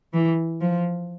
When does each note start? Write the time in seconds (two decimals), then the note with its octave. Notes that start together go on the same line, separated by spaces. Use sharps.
0.14 E3
0.61 F3